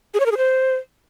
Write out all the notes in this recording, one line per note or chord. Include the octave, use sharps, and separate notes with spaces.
G#4
C#5
A#4
G#4
C5